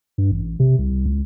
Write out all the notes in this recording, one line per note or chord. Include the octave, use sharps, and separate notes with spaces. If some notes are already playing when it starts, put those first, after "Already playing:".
G2
A1
C3
C2
C#2